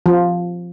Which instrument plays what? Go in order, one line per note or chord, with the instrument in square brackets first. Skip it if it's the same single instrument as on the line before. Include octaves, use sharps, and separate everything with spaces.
[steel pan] F3